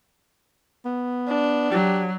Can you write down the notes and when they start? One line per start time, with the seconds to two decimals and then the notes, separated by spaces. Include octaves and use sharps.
0.85 B3
1.28 D4
1.71 F#3 G4